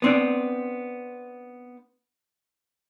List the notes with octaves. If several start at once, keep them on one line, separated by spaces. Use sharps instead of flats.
B3 C4 D4